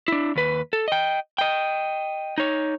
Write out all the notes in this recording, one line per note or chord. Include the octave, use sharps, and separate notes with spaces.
D4 E4
D#2 B4
A4
D#5 G5
D#5 G5
D#4 C#5